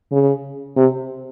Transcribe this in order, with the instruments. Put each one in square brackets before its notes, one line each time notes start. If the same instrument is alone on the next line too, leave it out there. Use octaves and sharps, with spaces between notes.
[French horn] C#3
C3